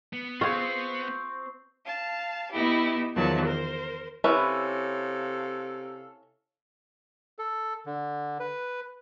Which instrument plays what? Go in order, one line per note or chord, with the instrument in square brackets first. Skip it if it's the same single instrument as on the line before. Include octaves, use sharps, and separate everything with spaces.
[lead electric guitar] B3
[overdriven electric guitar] C4 C5 [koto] F4 G#4 [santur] C#6
[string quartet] F5 A5
B3 D#4 E4 G4
E2 D#3 F3 F#3 A5
A#4 C5
[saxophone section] C3 A4 F5 [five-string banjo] C#4 E4 B4
[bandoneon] A4
D3
B4